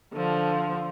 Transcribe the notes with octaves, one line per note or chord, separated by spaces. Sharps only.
D3 F3